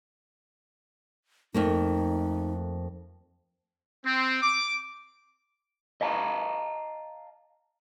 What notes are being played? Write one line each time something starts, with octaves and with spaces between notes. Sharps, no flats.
F2 A3 A#3 D#4
C4
D6
D#5 F5 A5 A#5